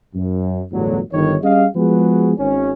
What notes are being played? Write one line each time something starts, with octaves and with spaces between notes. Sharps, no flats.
F#2
G1 E2 A2 D3 F#3
G1 D#3 C#5
G3 C#4 G#4 D#5 F5
F3 G#3 B3 F#4 G#4 B4
G#1 C#4